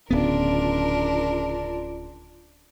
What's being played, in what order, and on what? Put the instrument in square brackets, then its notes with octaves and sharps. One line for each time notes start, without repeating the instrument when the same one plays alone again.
[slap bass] D1 B3 [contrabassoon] C#3 [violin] D4 A#4 [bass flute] F4